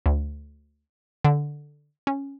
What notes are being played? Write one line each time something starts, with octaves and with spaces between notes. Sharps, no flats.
D2
D3
C#4